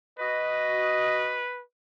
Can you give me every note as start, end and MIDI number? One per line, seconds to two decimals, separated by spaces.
0.19 1.44 66
0.19 1.61 71
0.19 1.44 75